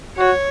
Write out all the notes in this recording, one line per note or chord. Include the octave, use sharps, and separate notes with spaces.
F#4 C#5